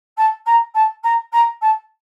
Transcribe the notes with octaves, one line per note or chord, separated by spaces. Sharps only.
A5
A#5
A5
A#5
A#5
A5